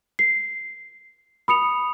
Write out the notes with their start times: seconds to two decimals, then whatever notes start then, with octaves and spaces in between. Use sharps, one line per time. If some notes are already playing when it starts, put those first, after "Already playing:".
0.19 C7
1.48 B5 D#6 C#7 F7